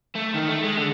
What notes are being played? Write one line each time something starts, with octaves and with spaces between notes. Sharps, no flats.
A3
D#3
A3
G#3
D3